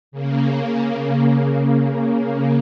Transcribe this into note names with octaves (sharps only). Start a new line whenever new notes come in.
C#3 A#3